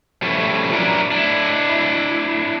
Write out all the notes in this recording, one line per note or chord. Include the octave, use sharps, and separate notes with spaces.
F3 G3 A3 C#4 E4
F#3 D4 E4 A4 A#4
D4 E4